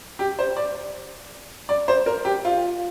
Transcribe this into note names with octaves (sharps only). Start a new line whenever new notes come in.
G4
C5
D5
D5
C5
A#4
G4
F4